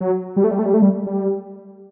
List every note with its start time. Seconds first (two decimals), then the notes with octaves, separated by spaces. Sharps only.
0.01 F#3
0.36 G3
0.44 A3
0.51 G3
0.59 A3
0.66 G3
0.74 A3
0.82 G3
1.06 G3